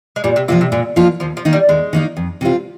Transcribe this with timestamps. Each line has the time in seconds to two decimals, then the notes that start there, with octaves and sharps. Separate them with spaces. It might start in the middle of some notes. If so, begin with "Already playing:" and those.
0.16 G#3
0.24 A#2 G3
0.36 C3
0.48 C3 F3 A#3 F4
0.61 C3
0.72 A#2 D3
0.96 D#3 F3 A#3 F4
1.20 D#2 F3
1.37 F3
1.45 D#3 A#3 D#4
1.53 G3
1.69 D#2 G#3
1.93 D#3 A#3 D#4
2.17 F2
2.41 C3 G3 C4 F4